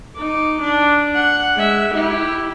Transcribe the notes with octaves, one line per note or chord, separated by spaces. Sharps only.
D#4 D6
D4
F#5
G#3 E5
E4 G4